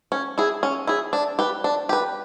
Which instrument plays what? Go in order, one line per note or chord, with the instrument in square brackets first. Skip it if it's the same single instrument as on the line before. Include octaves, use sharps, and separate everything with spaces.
[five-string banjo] C#4
E4 G#4
C#4
E4 G#4
D4
G4 B4
D4
G4 B4